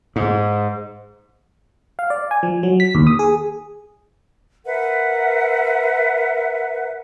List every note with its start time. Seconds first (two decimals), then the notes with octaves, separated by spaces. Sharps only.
0.16 G#2
1.99 F5
2.10 D5
2.31 G#5
2.43 F3
2.63 F#3
2.80 B6
2.95 D#2
3.07 D#6
3.19 G#4
4.66 A#4 B4 E5 F#5